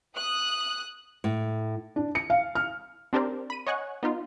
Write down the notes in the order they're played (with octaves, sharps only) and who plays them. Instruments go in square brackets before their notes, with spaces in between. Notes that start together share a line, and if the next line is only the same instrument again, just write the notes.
[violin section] D#6 F#6
[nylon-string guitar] A2
[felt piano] D4
C#7
F5
F6
[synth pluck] C4 D4 G4 A#4 C5 D5
B5 D#7
C#5 D#5 F#5 G#5 C#6 F#6
B3 D#4 F4